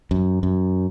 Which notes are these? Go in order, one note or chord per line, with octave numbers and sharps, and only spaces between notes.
F#2
F#2